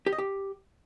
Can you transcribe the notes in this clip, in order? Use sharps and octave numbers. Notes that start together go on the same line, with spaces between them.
G4
D#5
G4